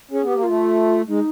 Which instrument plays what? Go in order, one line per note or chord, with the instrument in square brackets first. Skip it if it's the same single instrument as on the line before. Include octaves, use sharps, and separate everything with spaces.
[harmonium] C#4 [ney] G#4
[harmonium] B3 [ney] G4
[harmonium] A#3
[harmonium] A3 [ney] F4
[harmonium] G#3 [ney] D#4